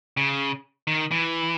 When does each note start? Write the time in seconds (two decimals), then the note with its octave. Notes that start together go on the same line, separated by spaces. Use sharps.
0.17 C#3
0.87 D#3
1.11 E3